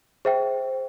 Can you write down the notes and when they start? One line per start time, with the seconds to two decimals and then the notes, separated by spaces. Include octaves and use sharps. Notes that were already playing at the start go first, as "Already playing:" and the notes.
0.25 G#4 C5 E5 G5